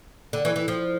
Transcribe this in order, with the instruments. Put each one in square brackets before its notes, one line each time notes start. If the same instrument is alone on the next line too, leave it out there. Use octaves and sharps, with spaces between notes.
[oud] D3
E3
E3
F3